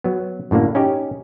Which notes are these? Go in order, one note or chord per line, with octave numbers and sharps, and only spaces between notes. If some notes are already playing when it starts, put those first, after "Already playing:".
F#3 B3
F#2 A2 D3 A#3
C#4 D#4 G4